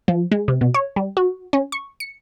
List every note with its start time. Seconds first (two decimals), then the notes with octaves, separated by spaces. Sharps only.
0.08 F3
0.32 G#3
0.48 C3
0.61 B2
0.74 C#5
0.96 G3
1.17 F#4
1.53 C#4
1.72 C#6
2.00 C#7